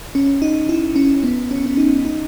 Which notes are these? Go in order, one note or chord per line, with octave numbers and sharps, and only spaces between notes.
C#4
D#4
E4
C#4
B3
C#4
C#4
D#4
D#4